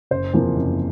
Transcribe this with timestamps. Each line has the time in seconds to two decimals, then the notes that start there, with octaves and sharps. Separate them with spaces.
0.11 F#1 C5
0.33 E2 C3 F3 A#3
0.56 F#1